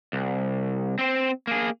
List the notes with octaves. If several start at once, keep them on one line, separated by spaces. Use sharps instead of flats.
C2
C4 C5
A#3 G#4